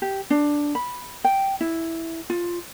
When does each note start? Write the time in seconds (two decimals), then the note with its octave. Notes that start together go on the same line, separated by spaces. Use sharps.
0.02 G4
0.30 D4
0.75 B5
1.24 G5
1.61 E4
2.30 F4